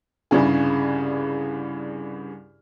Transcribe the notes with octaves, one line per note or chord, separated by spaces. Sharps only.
C2 G2 C#3 G#4